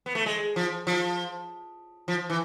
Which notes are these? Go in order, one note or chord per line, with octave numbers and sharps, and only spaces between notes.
B3
A3
G#3
F3
F3
F3
E3